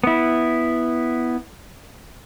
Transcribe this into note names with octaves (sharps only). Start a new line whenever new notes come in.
B3 E4